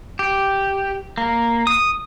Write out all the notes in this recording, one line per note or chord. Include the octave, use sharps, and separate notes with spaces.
G4
A#3
D#6